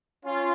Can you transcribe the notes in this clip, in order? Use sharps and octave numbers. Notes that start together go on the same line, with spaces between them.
C#4 F4